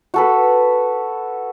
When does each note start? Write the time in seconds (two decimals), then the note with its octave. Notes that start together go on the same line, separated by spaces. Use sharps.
0.14 F#4 A4 B4